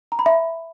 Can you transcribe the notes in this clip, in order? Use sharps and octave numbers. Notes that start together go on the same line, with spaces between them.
A#5
B5
E5